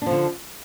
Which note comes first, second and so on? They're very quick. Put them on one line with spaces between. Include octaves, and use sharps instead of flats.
D4 F3 D3